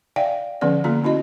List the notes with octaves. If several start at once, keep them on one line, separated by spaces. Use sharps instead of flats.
D5 E5 F5 G5 G#5
D3 F3 B3 C#4 D5
D3 A#3 F4 A#5
C#4 E4 F#4 D#5